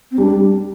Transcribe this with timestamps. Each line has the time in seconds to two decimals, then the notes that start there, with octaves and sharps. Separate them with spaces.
0.11 C4
0.18 G3 D4